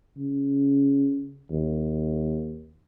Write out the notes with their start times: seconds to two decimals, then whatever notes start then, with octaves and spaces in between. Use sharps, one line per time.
0.17 C#3
1.51 D#2